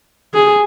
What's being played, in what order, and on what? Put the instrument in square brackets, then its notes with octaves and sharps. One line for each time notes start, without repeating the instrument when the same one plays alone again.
[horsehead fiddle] G#4